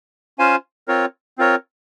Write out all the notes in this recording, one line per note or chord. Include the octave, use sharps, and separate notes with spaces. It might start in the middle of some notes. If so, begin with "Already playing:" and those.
C#4 F4 C5 F5 G#5
C4 F4 A#4 C#5
C4 F4 A#4 C#5